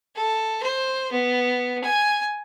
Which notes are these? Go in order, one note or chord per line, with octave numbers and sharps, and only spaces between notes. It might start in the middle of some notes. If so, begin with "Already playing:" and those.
A4
C5
B3
G#5